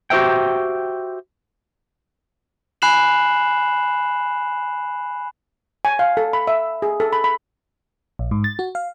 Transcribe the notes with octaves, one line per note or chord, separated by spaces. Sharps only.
F#4 G4 C5 E5 G5
G#5 B5 F#6 C7 E7 F#7
G#5
F5
A4
B5
E5
G#4
A4
B5
B5
A#1
G#2
A6
F#4
F5